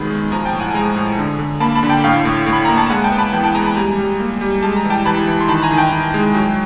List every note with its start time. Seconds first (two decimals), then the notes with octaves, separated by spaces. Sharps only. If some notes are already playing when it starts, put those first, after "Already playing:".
Already playing: D#3 F#3 G#3 B3 B5
0.10 G#3
0.31 F3 G#5 A#5
0.45 G5 A5
0.53 A2
0.60 F#5 G#5
0.74 G#3 G#5 A#5
0.96 A2
1.18 D3
1.39 D3
1.60 A#3 A5 B5
1.75 A5 B5
1.83 D3
1.89 G5 A5
2.04 A2 F5 G5
2.25 A2
2.46 A2
2.53 B5
2.65 A#3 A#5
2.77 A5
2.90 G#3 F#5 G#5
3.04 G5 A5
3.11 B3
3.18 A5 B5
3.33 E3 G5 A5
3.44 G5 A5
3.55 G#3 G#5 A#5
3.66 A5 B5
3.76 G3 G#5 A#5
3.98 G3
4.20 A#3
4.41 G3
4.63 G#3 A5
4.76 A#5
4.84 E3
4.90 G5 A5
5.05 E3 A5 B5
5.27 E3
5.41 C6
5.48 D#3 A5 B5
5.63 G#5 A#5
5.71 D#3
5.77 G5 A5
5.92 D#3
6.14 G#3
6.34 F#3